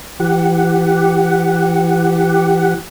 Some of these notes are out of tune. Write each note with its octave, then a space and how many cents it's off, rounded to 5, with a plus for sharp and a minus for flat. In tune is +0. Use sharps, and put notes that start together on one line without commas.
E3 +35 G4 +0 F#5 +0